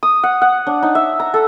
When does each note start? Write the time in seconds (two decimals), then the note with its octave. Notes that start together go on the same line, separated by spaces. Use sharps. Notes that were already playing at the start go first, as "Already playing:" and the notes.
0.03 D#6
0.23 F#5
0.42 F#5
0.67 D4
0.83 D#4
0.95 E5
1.20 A#5
1.34 A4